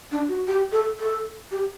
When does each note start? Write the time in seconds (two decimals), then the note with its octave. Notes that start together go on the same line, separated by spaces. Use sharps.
0.11 D4
0.28 F#4
0.47 G4
0.72 A4
1.00 A4
1.51 G4